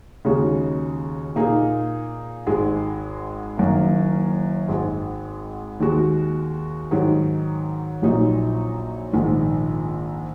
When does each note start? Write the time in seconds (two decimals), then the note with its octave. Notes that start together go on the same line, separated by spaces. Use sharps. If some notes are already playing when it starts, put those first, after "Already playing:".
0.25 D#2 C#3 G#3 D#4 F#4
1.35 A#2 A#3 D#4 G#4
2.47 G#1 G#2 G#3
3.58 F#1 F#2 D#3 A#3
4.69 G#1 G#2 G#3
5.80 D#2 D#3 G#3 F#4
6.91 G#2 D#3 F#3 D#4
8.02 A#1 A#2 F#3 D#4
9.13 A#1 G#2 D#3